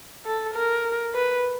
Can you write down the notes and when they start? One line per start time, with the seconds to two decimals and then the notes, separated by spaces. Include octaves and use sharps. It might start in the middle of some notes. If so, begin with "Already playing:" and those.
0.26 A4
0.54 A#4
1.14 B4